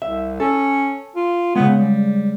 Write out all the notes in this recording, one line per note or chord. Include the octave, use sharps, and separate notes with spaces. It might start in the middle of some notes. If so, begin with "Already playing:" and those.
C2 E5
C#4 A4
F4
C#3 G#3 B3
G3